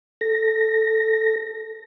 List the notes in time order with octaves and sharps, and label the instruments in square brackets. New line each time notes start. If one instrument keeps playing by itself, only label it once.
[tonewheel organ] A4 A#6